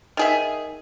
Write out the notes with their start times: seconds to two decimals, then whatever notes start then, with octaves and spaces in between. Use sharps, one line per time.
0.17 D#3 G#4 E5